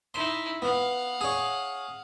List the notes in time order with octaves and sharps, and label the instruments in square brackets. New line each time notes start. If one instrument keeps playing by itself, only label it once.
[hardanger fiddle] D#4 E4 [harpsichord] C6
[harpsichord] B3 [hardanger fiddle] F5 F#5
[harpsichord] G#4 C#5